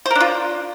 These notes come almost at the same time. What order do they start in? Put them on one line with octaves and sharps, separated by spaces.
C5 A#4 D4 F4